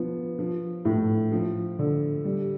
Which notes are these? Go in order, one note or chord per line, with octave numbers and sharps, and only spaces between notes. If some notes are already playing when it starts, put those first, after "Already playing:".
Already playing: F3 B3
F3
A2
F3
D3
G3